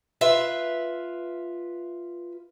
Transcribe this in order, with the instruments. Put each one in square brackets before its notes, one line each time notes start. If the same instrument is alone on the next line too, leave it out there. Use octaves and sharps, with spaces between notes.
[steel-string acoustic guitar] F4 B4 E5